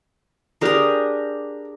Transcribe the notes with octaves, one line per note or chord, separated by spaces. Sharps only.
D4 G4 G#4 A#4 D#6